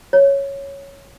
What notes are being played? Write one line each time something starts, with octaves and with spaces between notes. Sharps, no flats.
C#5